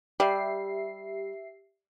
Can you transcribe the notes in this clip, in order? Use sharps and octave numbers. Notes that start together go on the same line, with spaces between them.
G3 G4 E5 C7